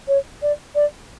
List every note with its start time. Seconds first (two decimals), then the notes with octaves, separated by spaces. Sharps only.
0.08 C#5
0.42 D5
0.75 D5